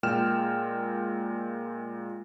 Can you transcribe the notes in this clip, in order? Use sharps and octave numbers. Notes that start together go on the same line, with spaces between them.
A#2 G#3 G5 F6 E7